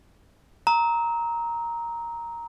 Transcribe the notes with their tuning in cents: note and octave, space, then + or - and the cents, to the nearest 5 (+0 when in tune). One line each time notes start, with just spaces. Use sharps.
A#5 +0 E6 -45